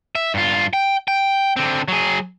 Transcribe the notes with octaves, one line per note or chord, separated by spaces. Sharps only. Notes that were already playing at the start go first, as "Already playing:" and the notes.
E5
G2 F4
G5
G5
D3 C4
F#3 G#4